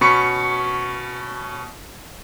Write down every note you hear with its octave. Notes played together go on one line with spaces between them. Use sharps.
B2 C#4 B5 C#6 C#7